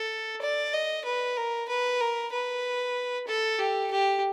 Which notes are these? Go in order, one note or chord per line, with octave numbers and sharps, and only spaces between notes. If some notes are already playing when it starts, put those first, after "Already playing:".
Already playing: A4
D5
D#5
B4
A#4
B4
A#4
B4
A4
G4
G4